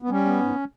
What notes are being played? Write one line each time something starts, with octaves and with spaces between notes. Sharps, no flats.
B3
G3 C#4
B3
G#2